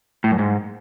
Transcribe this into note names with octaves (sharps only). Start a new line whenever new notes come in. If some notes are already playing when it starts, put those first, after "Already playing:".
A2
F#2
G#2